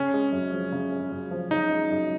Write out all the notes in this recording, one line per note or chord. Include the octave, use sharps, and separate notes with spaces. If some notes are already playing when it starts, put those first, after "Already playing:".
Already playing: C#3 C#4
G#3
F#2
F3
C#3
G#3
F#2
F3
C#3 D#4
G#3
F#2